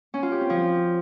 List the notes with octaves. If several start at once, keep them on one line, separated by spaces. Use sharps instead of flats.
C#4
F4
G4
C4
F3